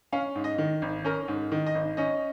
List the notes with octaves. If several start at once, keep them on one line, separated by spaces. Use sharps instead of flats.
C#4 F5
G#2
D#5
D#3
G#1
C#4 A#4
G#2
D#3
D#5
G#1
C#4 D#5